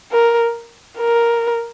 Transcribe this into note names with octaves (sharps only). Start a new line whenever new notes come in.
A#4
A#4